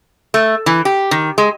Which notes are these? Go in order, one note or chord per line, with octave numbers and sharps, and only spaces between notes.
A3
E3
G4
D#3
G#3